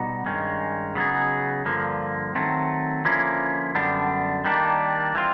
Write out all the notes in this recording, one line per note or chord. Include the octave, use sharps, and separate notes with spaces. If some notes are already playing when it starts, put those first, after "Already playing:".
Already playing: B2 G3 B3 D#4 F#4
G2 D#3 G#3 C#4
C#3 F#3 B3 D#4 G#4
G2 D3 F3 A#3
D#3 F#3 A3 C4
D3 F3 A#3 C#4 E4
F#2 D3 G3 B3 D4
D#3 G3 A#3 D4
E3 G3 C4 F4